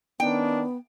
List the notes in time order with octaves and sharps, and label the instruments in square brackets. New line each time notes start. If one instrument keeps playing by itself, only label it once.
[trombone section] D#3 C#4 D4 [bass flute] B3 [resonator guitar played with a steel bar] G5